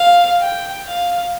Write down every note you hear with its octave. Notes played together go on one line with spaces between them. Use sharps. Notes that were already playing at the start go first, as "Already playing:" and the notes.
Already playing: F5
G5
F5